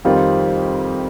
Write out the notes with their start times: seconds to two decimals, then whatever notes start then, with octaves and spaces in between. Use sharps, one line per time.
0.05 F2 D#3 G3 C4 F4